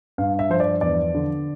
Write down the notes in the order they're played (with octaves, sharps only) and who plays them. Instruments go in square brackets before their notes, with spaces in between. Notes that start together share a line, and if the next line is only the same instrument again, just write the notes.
[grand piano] G2 F5
E5
F3 C5
D5
E2 D5
D3